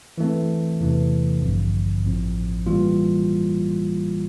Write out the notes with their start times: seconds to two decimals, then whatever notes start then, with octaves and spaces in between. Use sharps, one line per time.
0.18 E3 A3 C4
0.80 E2 C3 E3 A3
1.41 A1 G2 D3 F3 C4
2.04 A1 A2 F3 C4
2.66 A2 E3 G3 A#3 F4